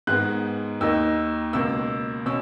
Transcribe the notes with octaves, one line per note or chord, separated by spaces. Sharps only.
G#2 D#3 G#3 B3 F#6
D#2 D#3 A#3 D#4 E6
C#2 B2 A#3 E6
B2 C#4 E6